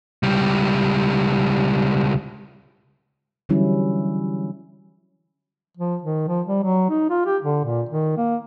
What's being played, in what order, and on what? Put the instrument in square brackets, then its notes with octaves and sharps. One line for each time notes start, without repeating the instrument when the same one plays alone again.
[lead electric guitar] C#2 G3
[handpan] D3 E3 F#3 G3 C#4 E4
[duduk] F3
D#3
F3
G3
F#3
D#4
F4
G4
D3
A#2
D#3
A#3